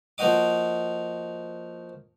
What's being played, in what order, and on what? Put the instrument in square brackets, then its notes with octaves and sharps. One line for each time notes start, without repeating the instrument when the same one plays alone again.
[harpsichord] F3 A#3 D#4 F#4 D#5 D6